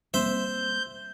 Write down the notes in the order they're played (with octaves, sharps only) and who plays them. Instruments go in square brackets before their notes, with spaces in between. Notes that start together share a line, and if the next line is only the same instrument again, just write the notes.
[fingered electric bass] G3 A#3 C4 [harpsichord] C5 E5 [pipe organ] G6